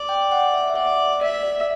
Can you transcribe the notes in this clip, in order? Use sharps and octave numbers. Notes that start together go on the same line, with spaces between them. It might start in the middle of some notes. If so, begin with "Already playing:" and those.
Already playing: D5
G5
F#5
E5
E5
D5 F#5
D5 E5
D5